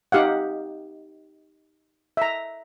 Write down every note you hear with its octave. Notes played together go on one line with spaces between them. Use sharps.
D#4 G4 F5 F#5
E5 A#5